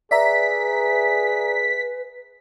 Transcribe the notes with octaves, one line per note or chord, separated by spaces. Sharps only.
G#4 B4 D5 E5 A#5 B6